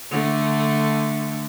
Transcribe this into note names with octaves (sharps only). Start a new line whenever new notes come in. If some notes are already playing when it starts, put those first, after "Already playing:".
D3 A3